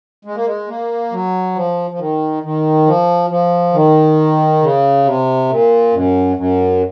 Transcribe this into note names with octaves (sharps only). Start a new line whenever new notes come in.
G#3
A#3
G#3
A#3
F#3
F3
F3
D#3
D#3
F3
F3
D#3
C#3
C3
A#2
F#2
F#2